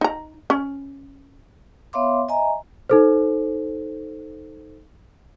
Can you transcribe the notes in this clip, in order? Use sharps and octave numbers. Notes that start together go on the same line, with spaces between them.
D#4 A#5
C#4
B3 C#5 E5 F5 C6 D6
D#5 E5 G#5 A#5
D#4 A4 C5